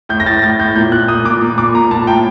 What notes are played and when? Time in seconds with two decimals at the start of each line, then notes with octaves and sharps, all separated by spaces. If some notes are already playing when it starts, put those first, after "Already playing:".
0.09 A2 G6
0.20 A#6
0.26 A2 A6
0.42 A2 A6
0.59 A2 G6
0.75 A#2 G6
0.92 A#2 F#6
1.08 A#2 D#6
1.25 A#2 D6
1.42 A#2
1.58 A#2 D6
1.74 A#2 A#5
1.91 A#2 A5
2.07 A2 G5